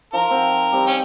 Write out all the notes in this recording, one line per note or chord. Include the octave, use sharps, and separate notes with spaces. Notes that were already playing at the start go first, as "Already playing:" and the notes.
F3 D#4 F4 A#4
C4 F#5
G3 C4
C#4 G5